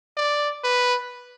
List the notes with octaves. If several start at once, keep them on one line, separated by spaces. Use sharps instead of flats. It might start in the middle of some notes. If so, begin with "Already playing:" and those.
D5
B4